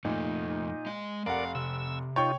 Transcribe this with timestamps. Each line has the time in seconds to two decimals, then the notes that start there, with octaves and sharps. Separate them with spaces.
0.05 F2 A#2 A3 D#4
0.86 G#3 D#5
1.26 F1 A#4 D5 F5 F#5
1.55 C3 E6
2.16 D#4 F4 C#5 G5 C#6